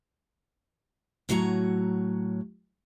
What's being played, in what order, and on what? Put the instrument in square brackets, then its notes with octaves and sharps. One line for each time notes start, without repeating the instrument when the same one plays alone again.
[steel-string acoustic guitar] A2 F#3 F#4 C#5 A#5